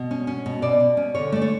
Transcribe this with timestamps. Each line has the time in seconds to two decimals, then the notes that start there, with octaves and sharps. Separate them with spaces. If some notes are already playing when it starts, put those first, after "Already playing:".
Already playing: B2
0.11 C#4
0.27 C#4
0.46 B2
0.62 B2 D5
0.80 B2
0.97 C#4
1.15 D3 C#5
1.32 A3 D5
1.42 C#5